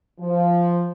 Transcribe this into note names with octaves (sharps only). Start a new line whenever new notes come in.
F3